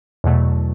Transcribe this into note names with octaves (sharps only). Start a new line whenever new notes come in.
E2 B2 F#3 A3